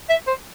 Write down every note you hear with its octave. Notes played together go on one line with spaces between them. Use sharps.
E5
C5